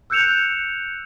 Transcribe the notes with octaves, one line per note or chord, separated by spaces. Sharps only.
E6 F#6 G6 C#7 E7 F7